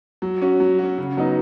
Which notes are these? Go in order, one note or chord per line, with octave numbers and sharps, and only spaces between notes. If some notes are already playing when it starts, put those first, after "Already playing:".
F#3
C#4 F#4
F#3
C#4 F#4
C#3
F#3 B3 D#4